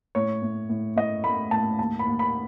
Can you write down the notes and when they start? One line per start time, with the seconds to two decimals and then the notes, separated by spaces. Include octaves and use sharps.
0.15 A2 C#5
0.42 A2
0.69 A2
0.96 A2 D#5
1.24 A3 B5
1.51 A2 A5
1.78 D#2 A5
1.99 B5
2.06 D#2
2.19 B5